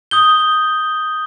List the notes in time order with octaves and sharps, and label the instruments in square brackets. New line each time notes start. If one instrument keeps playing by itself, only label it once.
[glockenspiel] D#6 G6 G7